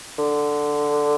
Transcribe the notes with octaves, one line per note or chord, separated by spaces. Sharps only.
D3